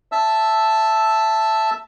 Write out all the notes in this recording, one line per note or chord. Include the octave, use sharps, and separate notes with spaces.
E5 A5 E6